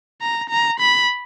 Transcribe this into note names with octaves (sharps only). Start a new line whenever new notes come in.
A#5
A#5
B5